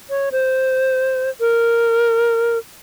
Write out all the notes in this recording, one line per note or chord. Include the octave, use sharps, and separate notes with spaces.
C#5
C5
A#4